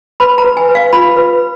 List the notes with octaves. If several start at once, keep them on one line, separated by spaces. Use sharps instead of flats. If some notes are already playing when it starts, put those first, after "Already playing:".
B4 B5
A#5
B4
G#5
B4
F5
F4 B5
B4